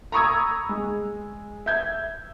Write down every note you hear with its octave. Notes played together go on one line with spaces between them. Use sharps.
A#5 B5 C#6 D#6 E6 G#6
G#3
E5 G6 G#6